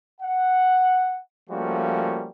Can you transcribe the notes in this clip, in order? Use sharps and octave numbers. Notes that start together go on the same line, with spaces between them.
F#5
F3 G3 A3 A#3 C#4 F#4